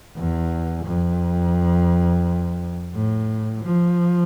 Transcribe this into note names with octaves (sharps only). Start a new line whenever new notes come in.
E2
F2
A2
F3